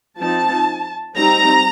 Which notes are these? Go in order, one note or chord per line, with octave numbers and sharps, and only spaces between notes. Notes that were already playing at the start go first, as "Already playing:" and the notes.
F3 C4 D#4 A5
G3 C4 D#4 A#5